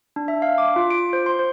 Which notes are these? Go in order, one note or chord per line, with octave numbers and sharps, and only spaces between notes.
D4
E5
F5
D6
F4
D7
C5
C6
C5